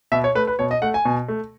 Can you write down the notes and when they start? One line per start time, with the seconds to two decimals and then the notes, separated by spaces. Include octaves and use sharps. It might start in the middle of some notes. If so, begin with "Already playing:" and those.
0.12 B2 E5
0.24 C#5
0.35 A3 B4
0.47 B4
0.59 B2 C#5
0.71 D#5
0.82 A3 F#5
0.94 G#5
1.05 B2
1.28 A3